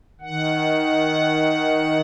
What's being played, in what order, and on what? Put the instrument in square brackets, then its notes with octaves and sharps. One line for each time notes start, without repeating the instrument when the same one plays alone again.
[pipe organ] D#3 F#5